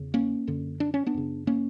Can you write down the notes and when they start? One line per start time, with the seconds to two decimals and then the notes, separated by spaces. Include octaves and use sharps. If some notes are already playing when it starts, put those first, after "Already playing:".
Already playing: E2 C#3
0.14 A#3 C#4
0.47 F#2 D3
0.80 D4
0.94 C#4
1.07 B3 D4
1.14 F#2 C#3
1.47 A#3 C#4